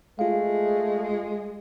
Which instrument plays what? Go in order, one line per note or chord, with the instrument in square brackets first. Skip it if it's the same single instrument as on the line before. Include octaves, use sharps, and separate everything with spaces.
[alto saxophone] G#3 [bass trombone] A3 [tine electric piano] F4 F5